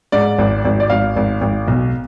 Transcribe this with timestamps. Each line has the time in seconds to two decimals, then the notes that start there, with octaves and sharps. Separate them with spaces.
0.12 G#2 D5
0.38 G#1
0.65 G#1
0.80 D5
0.90 G#1 F5
1.16 G#1
1.41 G#1
1.68 B1